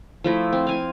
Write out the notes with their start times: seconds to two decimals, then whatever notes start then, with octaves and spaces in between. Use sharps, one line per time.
0.24 F3 A3 E4
0.53 C4
0.67 F5 G#5